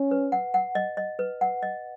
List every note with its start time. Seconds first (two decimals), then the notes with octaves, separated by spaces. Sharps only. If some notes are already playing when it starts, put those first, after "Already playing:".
Already playing: C#4
0.11 B4
0.32 F#5
0.54 F#5
0.75 D#5
0.97 D#5
1.19 B4
1.41 F#5
1.63 D#5